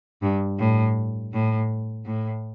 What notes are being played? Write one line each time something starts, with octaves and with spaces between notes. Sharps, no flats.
G2
A2
A2
A2